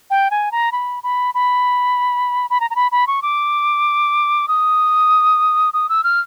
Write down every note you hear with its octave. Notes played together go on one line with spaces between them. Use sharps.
G5
G#5
A#5
B5
B5
B5
B5
A#5
A#5
B5
B5
C#6
D6
D#6
D#6
E6
F6